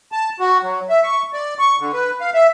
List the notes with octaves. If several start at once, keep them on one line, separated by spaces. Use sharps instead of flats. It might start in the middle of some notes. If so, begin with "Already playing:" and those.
A5
F#4
F#3
E5
C#6
D5
C#6
D3
B4
F5
E5